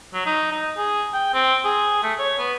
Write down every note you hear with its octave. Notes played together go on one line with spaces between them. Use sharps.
F#3
D#4
D#4
G#4
G5
C4
G#4
A3
C#5
B3